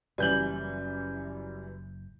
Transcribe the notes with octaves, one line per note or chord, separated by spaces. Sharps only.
F#1 F#2 E3 G3 G#5 G6 F#7